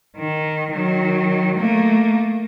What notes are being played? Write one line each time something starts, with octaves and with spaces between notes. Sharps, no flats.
D#3
D#3 F#3
A3 A#3